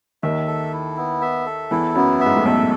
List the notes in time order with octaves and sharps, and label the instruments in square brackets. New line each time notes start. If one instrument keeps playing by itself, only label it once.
[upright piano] D#2 D#3 [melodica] E5
[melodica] A4
E4
B3
E5
A4
[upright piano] E2 E3 [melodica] E4
[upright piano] F#2 F#3 [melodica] B3
[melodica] E5
[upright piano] G#2
A2
[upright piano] B1 B2 [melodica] A4